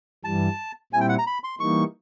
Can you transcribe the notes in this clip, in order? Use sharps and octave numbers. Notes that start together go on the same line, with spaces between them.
G2 E3 G3 A5
A#2 G3 C4 E4 G#5
G5
F#5
A#5
B5
C6
E3 G3 A#3 D#4 C#6